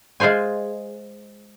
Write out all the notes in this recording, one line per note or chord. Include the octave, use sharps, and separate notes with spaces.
G#3 F4 G#4 C5 G#5